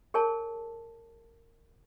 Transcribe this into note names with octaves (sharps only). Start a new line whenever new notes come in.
G#4 A#4 C#5 G#5 A5